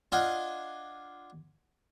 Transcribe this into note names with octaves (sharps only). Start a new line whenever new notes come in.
D4 F4 D#5 F5 F#5 G#5